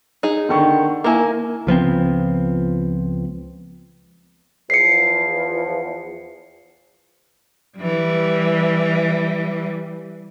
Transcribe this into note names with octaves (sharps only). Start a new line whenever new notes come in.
D#4 G#4
D3 D#3 C#6
A#3 E4 A#4 G#5
C#2 F3 B3 C4
E2 F3 C7 C#7
E3 G3